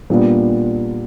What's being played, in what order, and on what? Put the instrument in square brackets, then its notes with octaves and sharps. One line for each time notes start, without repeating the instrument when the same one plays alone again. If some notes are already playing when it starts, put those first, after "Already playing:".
[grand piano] A#2 G3 B3 D4 F4